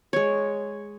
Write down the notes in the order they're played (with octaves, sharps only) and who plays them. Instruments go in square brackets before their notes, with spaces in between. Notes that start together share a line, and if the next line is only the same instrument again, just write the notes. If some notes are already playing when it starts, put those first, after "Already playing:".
[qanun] G#3 C#5